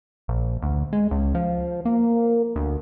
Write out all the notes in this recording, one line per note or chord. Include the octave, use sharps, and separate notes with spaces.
A#1
D2
G#3
C#2
F3
A#3
D2